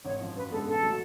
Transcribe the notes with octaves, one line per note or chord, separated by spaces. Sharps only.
G#1 C#5
F#2 F3
F#2 B4
D3 G#3 B3 A4
A1 A4
F#3 A3